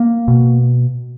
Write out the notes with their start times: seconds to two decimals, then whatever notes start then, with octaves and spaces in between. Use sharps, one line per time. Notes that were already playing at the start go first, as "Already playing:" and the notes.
Already playing: A#3
0.28 B2